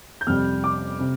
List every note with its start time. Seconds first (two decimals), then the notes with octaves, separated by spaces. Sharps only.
0.21 G6
0.27 F2 C3 G3 F6
0.64 D6
1.00 C3